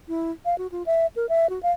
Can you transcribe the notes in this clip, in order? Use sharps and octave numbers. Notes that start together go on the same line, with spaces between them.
E4
F5
F#4
F4
E5
A#4
E5
F#4
F5